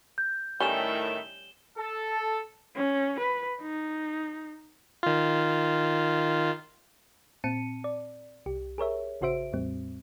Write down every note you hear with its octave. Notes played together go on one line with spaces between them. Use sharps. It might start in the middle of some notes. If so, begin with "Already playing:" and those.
G6
A2 D#3 G3 C#4 E5 E7 G7
A4
C#4
B4
D#4
D#3 F4
A#2 C4 A5 C#7 D#7
D5
C2 G4
G#4 A#4 C#5 E5
A1 C#3 F#4 C5 E5 D7
E2 A2 G3 C4